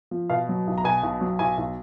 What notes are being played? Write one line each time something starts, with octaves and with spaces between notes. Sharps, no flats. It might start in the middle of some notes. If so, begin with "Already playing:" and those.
F3
B2 F5
F#3
B1
A#5
B2 G#5
B1
F#3
B1 G#5
B1